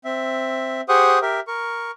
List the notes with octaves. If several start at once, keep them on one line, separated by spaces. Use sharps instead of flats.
C4 E5
G4 G#4 C5 F#5 C#6 D#6
G4 A#4 E5
A#4 C#6